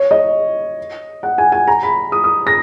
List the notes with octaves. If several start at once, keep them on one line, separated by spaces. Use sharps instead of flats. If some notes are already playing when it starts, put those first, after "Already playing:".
Already playing: C#5
D#5
F#5
G#5
G#5
A#5
B5
D#6
D#6
A#6